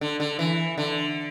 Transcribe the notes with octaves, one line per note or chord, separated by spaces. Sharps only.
D3
D3
E3
D3